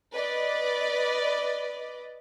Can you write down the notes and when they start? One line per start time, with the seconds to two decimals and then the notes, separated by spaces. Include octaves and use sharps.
0.13 B4 D5 D#5